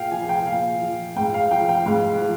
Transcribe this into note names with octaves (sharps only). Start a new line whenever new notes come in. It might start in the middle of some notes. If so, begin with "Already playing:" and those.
Already playing: A#2 F5 G5
F3 G#5
G#5
G5
A#2 F5
F3
G#2 G5
F5
F3 G5
G5
G#2 F5
F3